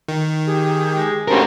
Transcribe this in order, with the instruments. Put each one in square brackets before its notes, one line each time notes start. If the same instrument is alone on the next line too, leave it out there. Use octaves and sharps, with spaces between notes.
[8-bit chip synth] D#3
[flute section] G4 G#4
[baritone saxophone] G#3
[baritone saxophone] G2 [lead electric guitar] A3 A#4 [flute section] C#4 F#4 C5